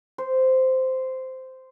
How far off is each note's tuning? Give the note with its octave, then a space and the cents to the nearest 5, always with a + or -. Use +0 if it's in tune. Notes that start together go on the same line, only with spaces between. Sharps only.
C5 -10